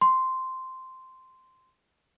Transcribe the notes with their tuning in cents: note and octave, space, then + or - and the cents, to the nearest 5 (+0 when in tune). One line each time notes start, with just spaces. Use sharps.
C6 -10